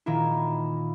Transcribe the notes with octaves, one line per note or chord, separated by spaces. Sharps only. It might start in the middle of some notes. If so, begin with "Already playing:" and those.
A#2 D#3 E4